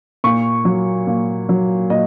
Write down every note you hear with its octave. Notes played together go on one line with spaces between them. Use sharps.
A#2 C#6
F#3
A#2
F#3
A#2 D#5